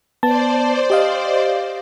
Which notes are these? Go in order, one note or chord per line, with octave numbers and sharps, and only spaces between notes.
B3 C5 D5 A5
G4 D#5 F5